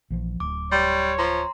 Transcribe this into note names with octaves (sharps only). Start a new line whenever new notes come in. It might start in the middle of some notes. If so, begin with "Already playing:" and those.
A#1 E3 F3
D1 D6
G3 C#5 C6
F3 A#5 C6